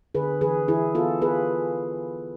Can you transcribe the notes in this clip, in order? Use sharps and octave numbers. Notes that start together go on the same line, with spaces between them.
D3 G#4 B4
E3 G#4 B4
E3 E4 G#4
B3 F4 A4
B3 G#4 B4